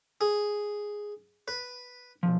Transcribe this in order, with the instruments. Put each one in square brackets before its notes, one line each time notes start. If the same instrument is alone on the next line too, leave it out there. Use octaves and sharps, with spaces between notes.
[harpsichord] G#4
B4
[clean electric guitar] B1 F2 F3